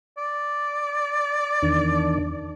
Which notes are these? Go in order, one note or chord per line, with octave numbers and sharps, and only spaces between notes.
D5
E2 D#3 D4